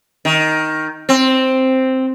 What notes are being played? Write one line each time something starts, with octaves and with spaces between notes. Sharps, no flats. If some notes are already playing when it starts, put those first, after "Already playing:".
D#3
C4